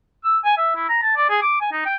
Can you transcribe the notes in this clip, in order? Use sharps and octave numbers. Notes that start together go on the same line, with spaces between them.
E6
G#5
E5
E4
A#5
A5
D5
G#4
D6
G#5
D#4
G5